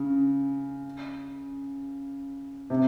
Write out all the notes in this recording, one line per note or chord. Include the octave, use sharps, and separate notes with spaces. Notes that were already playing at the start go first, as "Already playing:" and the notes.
Already playing: C#3
C3